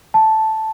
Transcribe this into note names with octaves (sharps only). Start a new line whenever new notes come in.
A5